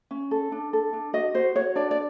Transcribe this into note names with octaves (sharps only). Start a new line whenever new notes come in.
C#4
A4
D4
A4
D4
F#4 D#5
F#4 C5
F#4 C#5
D4 D5
D5